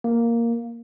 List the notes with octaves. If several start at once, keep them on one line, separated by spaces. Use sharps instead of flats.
A#3